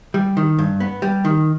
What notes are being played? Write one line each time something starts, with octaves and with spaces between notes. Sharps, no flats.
G3
D#3
G2
B3
G3
D#3